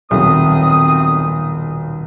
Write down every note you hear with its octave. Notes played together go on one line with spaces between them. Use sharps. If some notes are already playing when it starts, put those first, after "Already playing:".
D#1 B1 A3 C4 D#6